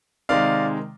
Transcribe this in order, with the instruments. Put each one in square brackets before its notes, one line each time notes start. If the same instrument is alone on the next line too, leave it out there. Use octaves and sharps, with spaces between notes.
[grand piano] C3 D#3 G#3 D5 F5